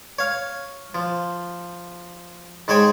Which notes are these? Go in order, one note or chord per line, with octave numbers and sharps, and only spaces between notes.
C#5 F5
F3
G#2 G#3 C5 C#5 G5 C#6